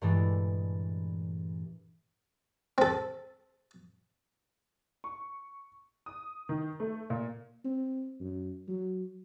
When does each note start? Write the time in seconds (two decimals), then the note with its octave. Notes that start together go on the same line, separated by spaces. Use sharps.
0.02 G2 A#2 E3 G#3 A3 D4
2.78 C4 A4
5.04 C#6
6.06 D#6
6.49 D#3
6.80 A3
7.10 A#2
7.65 C4
8.20 F#2
8.68 F#3